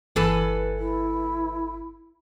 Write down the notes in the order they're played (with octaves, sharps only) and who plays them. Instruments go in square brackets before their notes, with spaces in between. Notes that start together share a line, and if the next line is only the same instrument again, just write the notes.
[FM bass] G1 [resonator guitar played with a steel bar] E3 A4 B4
[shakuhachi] E4